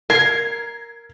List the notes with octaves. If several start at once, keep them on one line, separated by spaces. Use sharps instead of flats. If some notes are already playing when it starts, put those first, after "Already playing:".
A#4 G#6 C7